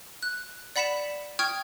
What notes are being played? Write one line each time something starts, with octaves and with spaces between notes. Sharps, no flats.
F#6
D5 F#5 B5 B6 C#7 E7
G5 C#6 D#6 F6 G#6